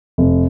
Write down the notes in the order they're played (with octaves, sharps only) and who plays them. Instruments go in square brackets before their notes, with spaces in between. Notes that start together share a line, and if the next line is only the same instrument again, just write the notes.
[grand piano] F1